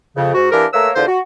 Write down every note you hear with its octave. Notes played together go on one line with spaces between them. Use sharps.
F2 C#3
G#2 F#4
E3 A#3 D4 G4 A#4
A3 A#3 A#4 B4 C#5 E6
E2 D3 F4 C5
F#4